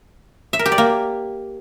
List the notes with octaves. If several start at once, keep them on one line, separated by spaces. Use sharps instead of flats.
E5
A#4
G4
D5
A#3